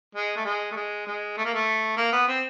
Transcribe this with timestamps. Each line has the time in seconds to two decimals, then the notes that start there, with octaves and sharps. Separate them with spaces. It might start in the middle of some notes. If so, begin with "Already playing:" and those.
0.15 G#3
0.36 A3
0.45 G#3
0.71 A3
0.76 G#3
1.07 G#3
1.37 A3
1.45 A#3
1.54 A3
1.97 A#3
2.12 B3
2.28 C4